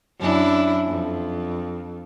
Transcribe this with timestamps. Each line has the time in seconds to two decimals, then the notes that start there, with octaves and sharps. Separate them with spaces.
0.19 F#2 D4 E4
0.87 F2